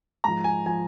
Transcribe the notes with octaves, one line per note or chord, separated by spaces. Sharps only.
G#2 F3 A#5
G#5
F3 G#5